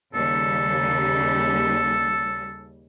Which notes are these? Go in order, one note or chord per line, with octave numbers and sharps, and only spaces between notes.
D#2 C#3 G3 A4